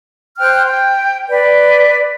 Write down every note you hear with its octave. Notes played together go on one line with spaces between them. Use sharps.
C5 G5 F6 F#6
G5
B4 D5